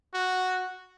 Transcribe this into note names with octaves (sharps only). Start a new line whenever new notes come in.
F#4